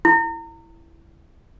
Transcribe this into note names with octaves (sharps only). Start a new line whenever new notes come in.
E4